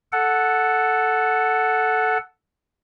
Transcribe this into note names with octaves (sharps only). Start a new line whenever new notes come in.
A4 F#5